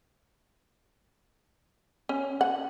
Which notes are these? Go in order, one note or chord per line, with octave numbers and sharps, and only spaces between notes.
C#4
F#5